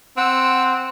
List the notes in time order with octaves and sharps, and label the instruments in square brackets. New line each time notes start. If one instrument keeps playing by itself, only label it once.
[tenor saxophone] C4 [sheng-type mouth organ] F#5 E6